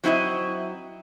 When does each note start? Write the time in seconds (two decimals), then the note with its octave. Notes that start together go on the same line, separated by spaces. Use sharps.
0.04 F#3 C4 E4 D#5